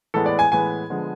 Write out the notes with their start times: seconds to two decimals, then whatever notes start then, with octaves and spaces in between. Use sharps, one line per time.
0.14 A2 E3 G#3 B3 A4
0.26 D5
0.39 G#5
0.52 A2 E3 G#3 B3 G#5
0.90 D3 F3 G#3 B3